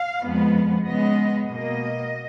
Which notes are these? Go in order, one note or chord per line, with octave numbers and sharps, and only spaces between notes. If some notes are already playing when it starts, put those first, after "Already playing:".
Already playing: F5
F2 F3 G#3 B3
C#3 G#3 B3 D#5
B2 A#3 D#5